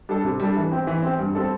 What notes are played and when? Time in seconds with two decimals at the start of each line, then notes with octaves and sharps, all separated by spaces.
0.09 G3 D4 A4
0.24 C3
0.40 G3 D4 A4
0.56 E3
0.72 C4 G4
0.87 E3
1.02 C4 G4
1.19 G2
1.35 G3 C4 A4